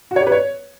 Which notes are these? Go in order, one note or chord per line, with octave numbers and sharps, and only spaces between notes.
F#4
C#5
G4
B4
C#5